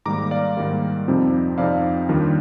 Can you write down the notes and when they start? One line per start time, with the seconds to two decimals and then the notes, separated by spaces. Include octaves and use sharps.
0.06 G#2 D#3 G3 A#3 A#5 D6
0.31 D5 F5
0.57 G#2 D#3 G3 A#3
1.07 F2 C3 F3 C4 D#4
1.58 F2 C3 F3 C4 D#4 D5 F5
2.09 D#2 D#3 G3 D4 F4